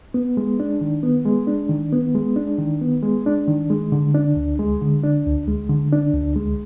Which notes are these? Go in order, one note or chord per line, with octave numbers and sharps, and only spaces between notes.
B3
G#3
D4
D#3
B3
G#3
D4
D#3
B3
G#3
D4
D#3
B3
G#3
D4
D#3
G#3
D3
D4
D2
G#3
D3
D4
D2
G#3
D3
D4
D2
G#3